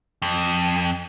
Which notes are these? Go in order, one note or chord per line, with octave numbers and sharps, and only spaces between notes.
F2